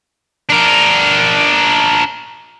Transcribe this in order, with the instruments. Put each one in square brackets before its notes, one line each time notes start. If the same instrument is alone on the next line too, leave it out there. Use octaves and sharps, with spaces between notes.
[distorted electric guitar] D4 A#4